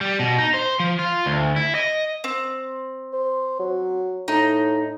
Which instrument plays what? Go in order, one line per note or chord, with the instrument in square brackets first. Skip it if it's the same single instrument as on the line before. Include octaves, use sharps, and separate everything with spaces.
[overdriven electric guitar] G3
B2
D#4
C5
F3
F4
D2
E4
D#5
[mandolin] C4
[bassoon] C5
F#3
[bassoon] A2 [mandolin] D#4